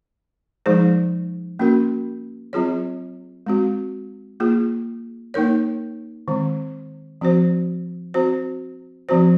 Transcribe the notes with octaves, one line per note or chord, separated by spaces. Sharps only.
F3 G#3 D#4 G#4 C5
A#3 C#4 F#4 A#4
F#3 C4 F4 G#4 C#5
G#3 C4 F#4
A#3 F4 G#4
A#3 D#4 A#4 C#5
D#3 G#3 C4
F3 C4 F#4 C5
C4 F#4 C5
F3 C4 F#4 C5